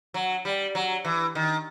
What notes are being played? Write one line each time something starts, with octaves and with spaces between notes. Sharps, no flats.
F#3
G3
F#3
E3
D#3